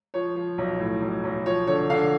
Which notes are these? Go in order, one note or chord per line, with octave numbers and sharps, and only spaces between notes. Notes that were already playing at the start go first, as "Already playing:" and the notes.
F3 C#5
F3
B1
A2
B1
B1
F3 C#5
D3 C#5
D3 F5